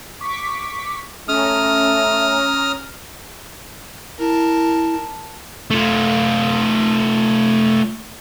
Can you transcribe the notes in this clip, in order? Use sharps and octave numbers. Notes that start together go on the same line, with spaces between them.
C#6 D6 B6
A3 C#4 A#5 D#6 F6
E4 A#4 A5
A3 F4